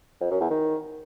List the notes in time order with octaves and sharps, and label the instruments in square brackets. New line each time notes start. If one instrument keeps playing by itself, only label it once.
[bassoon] F2
F#2
E2
D#3